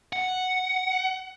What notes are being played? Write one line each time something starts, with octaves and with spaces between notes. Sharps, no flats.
F#5